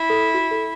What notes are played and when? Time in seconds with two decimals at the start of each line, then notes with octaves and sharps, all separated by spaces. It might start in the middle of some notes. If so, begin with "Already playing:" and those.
Already playing: E4
0.10 A4
0.34 F#4
0.51 A4